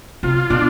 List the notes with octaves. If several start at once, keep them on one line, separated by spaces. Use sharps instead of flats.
C3 F4
B2 D4